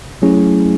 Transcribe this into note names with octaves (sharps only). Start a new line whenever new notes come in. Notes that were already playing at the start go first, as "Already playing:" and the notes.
F#3 A3 C#4 E4 G#4